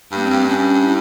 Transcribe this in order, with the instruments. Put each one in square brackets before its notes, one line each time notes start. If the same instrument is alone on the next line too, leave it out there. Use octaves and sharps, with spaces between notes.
[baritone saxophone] G2 [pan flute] A#3
[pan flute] C4
[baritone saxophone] G2
[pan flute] C#4
E4